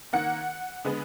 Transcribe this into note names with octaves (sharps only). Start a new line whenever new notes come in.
D#3 A#3 F#5
D3 G#3 B3